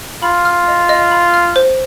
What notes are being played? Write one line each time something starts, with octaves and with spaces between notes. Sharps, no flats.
F4 B5
F6
D#5
D#5
B5
F6
C5